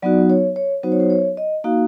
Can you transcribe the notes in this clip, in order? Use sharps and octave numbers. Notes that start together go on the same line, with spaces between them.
F#3 B3 D#4 F#4 D5
C#5
C#5
F#3 B3 D#4 F#4 C5
C#5
C5
C#5
D#5
A#3 D#4 F#4 F5